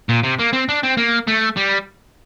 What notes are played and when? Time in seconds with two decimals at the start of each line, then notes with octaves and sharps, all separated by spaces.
0.09 A#2
0.24 C3
0.39 A#3
0.53 C4
0.69 D4
0.83 C4
0.97 A#3
1.28 A3
1.57 G3